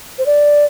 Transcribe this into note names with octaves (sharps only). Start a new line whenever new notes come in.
C5
D5